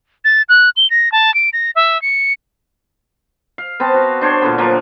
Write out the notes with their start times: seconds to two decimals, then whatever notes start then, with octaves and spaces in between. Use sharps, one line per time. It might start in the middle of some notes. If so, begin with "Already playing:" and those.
0.25 A6
0.49 F#6
0.76 G7
0.90 A#6
1.12 A5
1.34 D7
1.53 A#6
1.75 E5
2.02 C#7
3.58 F5
3.80 B3 C4 A5
3.94 F#4 F5
4.21 D4 C5 C#5 C#6
4.42 A#2 D3 B3
4.58 F3 F#3 A#3